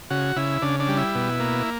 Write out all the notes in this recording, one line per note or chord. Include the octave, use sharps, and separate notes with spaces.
C#3 F#4
C#3 E4
C#3 D4
D4
G3
E4
B2
A#3